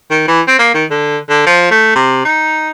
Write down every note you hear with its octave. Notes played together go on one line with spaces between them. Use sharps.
D#3
E3
C4
A#3
D#3
D3
D3
F3
A3
C3
D#4